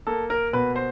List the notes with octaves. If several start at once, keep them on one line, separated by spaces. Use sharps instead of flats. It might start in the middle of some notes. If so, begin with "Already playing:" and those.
A#3 A4
A#4
B2 B4
C5